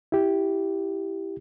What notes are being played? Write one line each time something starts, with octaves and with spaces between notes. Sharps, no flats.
E4 G4